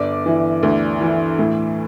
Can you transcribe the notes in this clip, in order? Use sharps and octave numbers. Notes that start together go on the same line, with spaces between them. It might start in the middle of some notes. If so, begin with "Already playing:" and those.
Already playing: G1 D5 D6
E3
D2
E3
A2